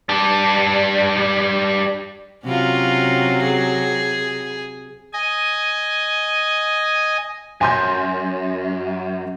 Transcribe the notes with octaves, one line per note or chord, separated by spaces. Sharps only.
G3 D4
C3 F#3 C#4 F4
G#4
D#5 G#5
F#2 G#5 C6 G6